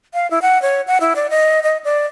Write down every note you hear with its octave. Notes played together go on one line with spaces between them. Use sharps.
F5
E4
F#5
C#5
F#5
E4
D5
D#5
D#5
D5